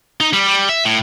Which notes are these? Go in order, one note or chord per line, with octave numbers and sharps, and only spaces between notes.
D#4
G3
G3
E5
A2